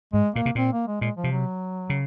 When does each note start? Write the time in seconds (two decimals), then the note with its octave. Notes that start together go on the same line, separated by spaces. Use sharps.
0.13 G#2 G#3
0.35 A#2 A#3
0.46 C3
0.55 A#2 C4
0.73 A#3
0.87 G#3
1.01 A#2 G#3
1.17 F3
1.24 C3
1.31 F#3
1.90 C#3